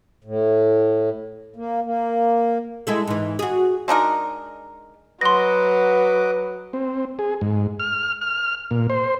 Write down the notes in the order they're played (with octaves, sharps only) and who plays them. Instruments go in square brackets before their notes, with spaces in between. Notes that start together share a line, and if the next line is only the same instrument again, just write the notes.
[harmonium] A2
A#3
A#3
[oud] G#3 E4 A4
G#2 E3
F#4 G#4
[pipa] G#3 D4 D#4 A#4
[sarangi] F#3 [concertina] F#4 D#5 D6 [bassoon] B4 [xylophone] C6 A#6
[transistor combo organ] C4
G#4
G#2
F6
F6
A#2
C5